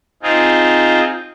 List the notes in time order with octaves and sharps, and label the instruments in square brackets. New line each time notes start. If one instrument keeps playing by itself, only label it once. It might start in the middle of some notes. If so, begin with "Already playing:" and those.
[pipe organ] C4 D#4 F4 G#4